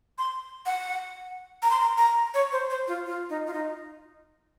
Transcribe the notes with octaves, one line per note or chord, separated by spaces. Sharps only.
C6
F#5
A#5
C6
A#5
A#5
C#5
C5
C5
F4
F4
D#4
F4
D#4